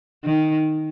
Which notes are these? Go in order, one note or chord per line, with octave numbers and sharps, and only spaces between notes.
D#3